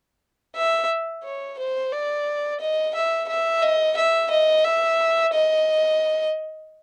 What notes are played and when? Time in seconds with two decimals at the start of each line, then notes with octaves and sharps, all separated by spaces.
0.55 E5
1.24 C#5
1.59 C5
1.92 D5
2.60 D#5
2.95 E5
3.28 E5
3.62 D#5
3.97 E5
4.30 D#5
4.65 E5
5.33 D#5